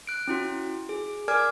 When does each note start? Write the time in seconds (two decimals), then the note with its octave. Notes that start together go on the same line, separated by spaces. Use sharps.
0.07 F#6 D7
0.28 C#4 E4 F#4
0.89 G#4
1.28 A#4 D5 G#5 D6 F6 G#6